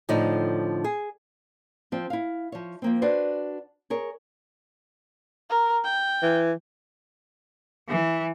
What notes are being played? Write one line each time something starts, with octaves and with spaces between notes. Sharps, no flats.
A2 D3 F3 D#4
G#4
F3 C4
E4 F5
F3 C#5
F3 A#3 C4
D4 F#4 B4 C5 D5
G#4 A#4 C#5
A#4
G5
E3
E3